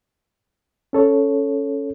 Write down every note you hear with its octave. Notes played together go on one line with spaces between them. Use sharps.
C#4 A4 C#5